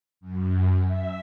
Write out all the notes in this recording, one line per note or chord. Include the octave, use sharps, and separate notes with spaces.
F#2
E5